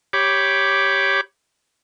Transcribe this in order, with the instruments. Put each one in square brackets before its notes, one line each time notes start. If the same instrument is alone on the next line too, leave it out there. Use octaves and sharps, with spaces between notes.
[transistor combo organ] G4 C#5 B5 D6